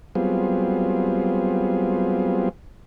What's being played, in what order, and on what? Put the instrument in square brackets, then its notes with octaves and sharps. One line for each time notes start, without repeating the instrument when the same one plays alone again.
[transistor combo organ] F#3 G3 B3 C4 F4 G#4